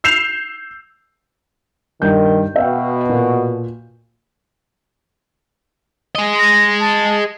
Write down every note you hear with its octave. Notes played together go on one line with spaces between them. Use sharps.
E6 G6 C7 E7 F7
G2 D#3 G6
B2 E5 F5 G5
A#2
G#4 D#5
A#6
A5